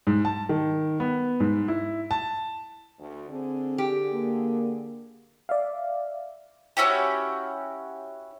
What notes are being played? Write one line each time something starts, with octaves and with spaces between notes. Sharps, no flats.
G#2
A5
D#3
B3
G#2
E4
A5
D2
D3 C4 G#4
G4
A#3
D5 E5 F5
C#4 E4 F#4 G4